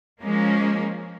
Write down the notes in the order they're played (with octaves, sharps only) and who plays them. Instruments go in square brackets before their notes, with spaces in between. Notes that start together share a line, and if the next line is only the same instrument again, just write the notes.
[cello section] F3 G#3 A#3 C#4